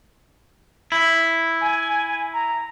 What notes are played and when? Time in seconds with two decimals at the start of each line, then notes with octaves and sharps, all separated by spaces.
0.92 E4
1.61 G#5
2.33 A#5